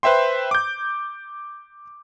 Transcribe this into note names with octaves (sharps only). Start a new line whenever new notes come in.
B4 C5 E5 G5 C6
D6 G6